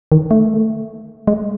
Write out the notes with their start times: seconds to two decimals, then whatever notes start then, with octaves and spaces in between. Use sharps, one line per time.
0.12 D#3
0.31 A3
1.27 G#3